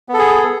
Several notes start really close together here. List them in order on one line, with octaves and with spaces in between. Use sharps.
B3 A4 G#4